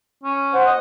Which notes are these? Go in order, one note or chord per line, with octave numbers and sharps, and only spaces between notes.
C#4
C5 F#5
D#5